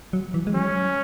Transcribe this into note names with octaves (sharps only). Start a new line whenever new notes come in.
F#3
E3
G#3
F#3 C#4